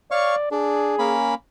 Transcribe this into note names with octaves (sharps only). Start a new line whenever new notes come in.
C#5 D5 F5 C#6
D4 G#4
A#3 C#4 B5